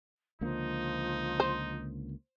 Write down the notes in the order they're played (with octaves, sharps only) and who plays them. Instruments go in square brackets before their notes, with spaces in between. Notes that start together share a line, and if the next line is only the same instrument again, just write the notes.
[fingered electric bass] C#2 D3 A#3 [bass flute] F3 [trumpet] D#4
[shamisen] C5